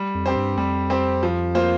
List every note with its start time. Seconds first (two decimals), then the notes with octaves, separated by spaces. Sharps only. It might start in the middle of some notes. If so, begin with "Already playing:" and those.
Already playing: G3
0.15 F2
0.26 C4 G4 C5
0.36 G2
0.57 F2 G3
0.90 C4 G4 C5
1.23 F3
1.55 A#3 F4 C5